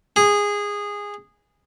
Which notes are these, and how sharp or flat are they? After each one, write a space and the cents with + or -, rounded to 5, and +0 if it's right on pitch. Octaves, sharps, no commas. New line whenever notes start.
G#4 -15